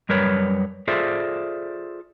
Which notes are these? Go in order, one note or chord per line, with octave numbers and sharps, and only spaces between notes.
F#2 G3 A#4 B4 C#5
F4 G#4 A4 C5 D5 E5